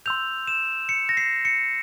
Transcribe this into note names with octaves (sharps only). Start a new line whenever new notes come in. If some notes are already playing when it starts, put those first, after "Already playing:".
C6 E6 G6 F7
E7
C#7
A#6
C7
C#7